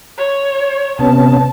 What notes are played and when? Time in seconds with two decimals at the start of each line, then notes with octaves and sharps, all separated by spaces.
0.18 C#5
0.99 C3 B3 C#4 A5